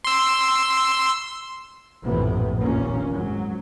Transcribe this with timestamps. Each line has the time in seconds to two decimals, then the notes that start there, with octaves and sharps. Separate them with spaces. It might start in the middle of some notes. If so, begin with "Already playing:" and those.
0.04 C6 E6
2.03 A#1 F#2 A2 C3 E3 B3
2.60 F1 D#2 A#2 A#3 C#4
3.13 G#2 F#3